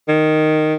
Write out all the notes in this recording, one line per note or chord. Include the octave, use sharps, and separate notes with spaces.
D#3